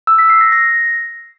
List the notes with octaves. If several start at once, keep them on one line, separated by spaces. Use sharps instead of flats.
E6
B6
C7
A#6
A#6